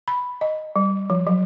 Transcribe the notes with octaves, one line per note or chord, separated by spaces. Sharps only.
B5
D#5
G3
F3
F#3